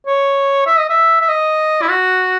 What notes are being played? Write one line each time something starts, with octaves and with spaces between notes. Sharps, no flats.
C#5
E5
D#5
E5
E5
D#5
E4
F#4